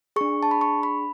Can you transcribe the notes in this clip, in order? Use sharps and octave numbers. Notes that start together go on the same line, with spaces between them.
D4 G#4 C#6
A5
B5
C#6
B5